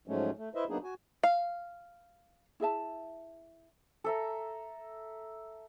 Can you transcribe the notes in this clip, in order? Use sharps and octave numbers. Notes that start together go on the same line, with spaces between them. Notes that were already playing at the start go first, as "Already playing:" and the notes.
G#2 F3 F#3 G#3 A3 C#4
A3
E4 B4 C5 D#5 E5
F#3 A#3 B3 D4 D#4 G#4
F#4 G#5
F5
E4 G#4 E5 A5
A4 E5 A#5